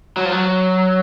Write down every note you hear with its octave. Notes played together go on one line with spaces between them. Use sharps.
F#3
F3
F#3